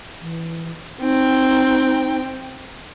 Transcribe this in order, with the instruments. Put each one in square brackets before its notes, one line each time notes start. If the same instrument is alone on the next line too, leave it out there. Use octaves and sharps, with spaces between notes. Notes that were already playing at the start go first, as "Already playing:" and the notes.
[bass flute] E3
[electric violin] C4 G5 [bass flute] D#4